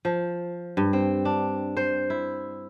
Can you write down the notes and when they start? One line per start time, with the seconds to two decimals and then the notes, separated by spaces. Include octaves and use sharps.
0.05 F3
0.77 G2
0.93 C4
1.25 D4
1.77 C5
2.10 E4